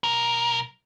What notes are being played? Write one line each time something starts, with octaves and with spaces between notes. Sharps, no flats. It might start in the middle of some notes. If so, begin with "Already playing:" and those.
B1 A#4